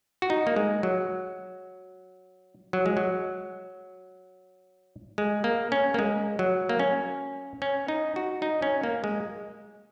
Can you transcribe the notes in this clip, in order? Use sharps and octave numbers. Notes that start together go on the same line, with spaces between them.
F#4
D#4
A#3
G#3
F#3
F#3
G#3
F#3
G#3
A#3
C#4
A#3
G#3
F#3
A#3
C#4
C#4
D#4
F#4
D#4
C#4
A#3
G#3